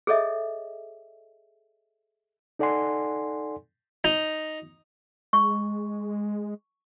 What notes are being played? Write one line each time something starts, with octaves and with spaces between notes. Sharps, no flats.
G#4 A4 C#5 D#5 E5
D#4 A4 D5 F#5 G#5 C6
D#4
G#3 C#6